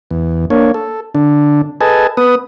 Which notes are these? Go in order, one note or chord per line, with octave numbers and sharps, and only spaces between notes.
E2
A#3 D4 C#5
A4
D3 D4
G#4 A4 B4 D#5 G#5 A5
B3 B4 D#6